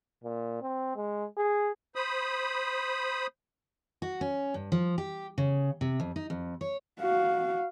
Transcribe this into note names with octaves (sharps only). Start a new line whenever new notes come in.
A#2
C4
G#3
G#4
C5 B5 D#6
F#4
C#4
G2
F3
G4
C#3
C3
F2
D#4
F2
C#5
F#4 F5